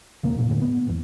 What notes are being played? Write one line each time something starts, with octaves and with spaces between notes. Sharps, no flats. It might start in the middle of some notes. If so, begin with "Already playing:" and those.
E1 C#3 A#3
E1 F#2 A#2
E1 D2 A2 D3
B3
G#1 E2